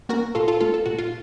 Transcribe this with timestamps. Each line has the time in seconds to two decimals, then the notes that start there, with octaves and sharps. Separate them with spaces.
0.09 A#3 C#4 F#4 A#4
0.35 A#2 F4 A4
0.48 F4 A4
0.60 A3 C#4 F4 A4
0.74 A4
0.86 A#2 F#4
0.99 F4